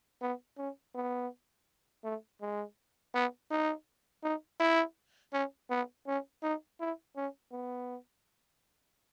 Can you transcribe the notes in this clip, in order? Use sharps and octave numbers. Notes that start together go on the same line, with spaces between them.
B3
C#4
B3
A3
G#3
B3
D#4
D#4
E4
C#4
B3
C#4
D#4
E4
C#4
B3